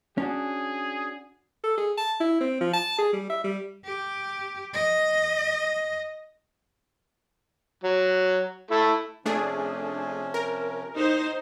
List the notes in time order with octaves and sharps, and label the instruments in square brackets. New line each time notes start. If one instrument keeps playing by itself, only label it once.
[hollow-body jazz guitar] C#4 D4 F#4 [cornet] G#4
[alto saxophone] A4
G#4
A5
E4
C4
F3
A5
G#4
G3
E5
G3
[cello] G4
D#5
[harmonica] F#3
A3 E4 A4
[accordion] C3 F3 C#4 [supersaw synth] A3 D4 G#4
[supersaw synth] A#4
[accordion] A2 [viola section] D#4 C5